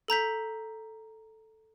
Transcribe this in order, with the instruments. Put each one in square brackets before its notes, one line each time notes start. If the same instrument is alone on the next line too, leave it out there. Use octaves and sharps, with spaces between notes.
[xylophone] A4 A#5 G6 B6